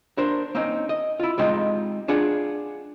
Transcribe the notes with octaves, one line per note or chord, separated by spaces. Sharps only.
D4 A#4 C5
A#3 C4 C#4 D#4
D#5
E4 F4
G3 G#3 C4 D#4 F4 G4
D4 F4 G#4 F#5